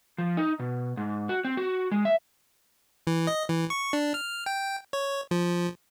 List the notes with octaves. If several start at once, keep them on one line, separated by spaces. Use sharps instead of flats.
F3
D#4
B2
G#2
F#4
C4
F#4
G#3
E5
E3
D#5
E3
C#6
D4
F6
G5
C#5
F3